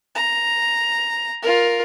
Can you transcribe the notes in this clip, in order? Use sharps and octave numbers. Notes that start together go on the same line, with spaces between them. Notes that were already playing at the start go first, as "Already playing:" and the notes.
A#5
F4 A#4